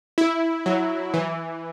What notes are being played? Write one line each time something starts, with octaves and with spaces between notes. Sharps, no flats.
E4
F#3
E3